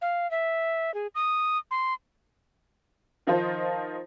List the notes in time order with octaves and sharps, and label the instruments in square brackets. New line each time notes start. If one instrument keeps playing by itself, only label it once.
[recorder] F5
E5
G#4
D#6
C6
[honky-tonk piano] D#3 F3 D#4 F4 C5